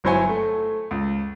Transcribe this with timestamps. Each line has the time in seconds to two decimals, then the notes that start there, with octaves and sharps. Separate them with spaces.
0.04 G1 F#3 E4 C5 C#5 G#5
0.29 A3
0.91 C#2